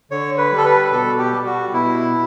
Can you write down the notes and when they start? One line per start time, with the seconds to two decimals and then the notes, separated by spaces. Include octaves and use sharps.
0.11 D3 C#5
0.38 B4
0.51 G3
0.57 A4
0.65 B4
0.92 B2 A4
1.19 G4
1.33 G3
1.46 F#4
1.73 B2 E4